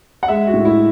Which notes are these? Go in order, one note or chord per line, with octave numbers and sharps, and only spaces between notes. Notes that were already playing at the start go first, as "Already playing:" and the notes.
F#5
G#3 E5
F#4
A2
E4